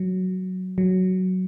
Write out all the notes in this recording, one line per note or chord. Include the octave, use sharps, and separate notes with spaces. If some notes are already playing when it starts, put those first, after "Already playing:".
Already playing: F#3
F#3